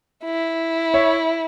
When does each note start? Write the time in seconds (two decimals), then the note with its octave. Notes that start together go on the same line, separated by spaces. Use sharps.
0.24 E4
0.94 C#5 E5